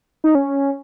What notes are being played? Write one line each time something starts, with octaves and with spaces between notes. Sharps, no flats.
D#4
C#4